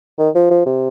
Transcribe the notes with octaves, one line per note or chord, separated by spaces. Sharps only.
D#3
F3
F3
C3